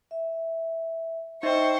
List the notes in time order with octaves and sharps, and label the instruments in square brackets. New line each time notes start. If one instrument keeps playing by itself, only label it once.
[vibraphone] E5
[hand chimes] D#4 E5 [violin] C5 C#6 [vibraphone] D#5 G5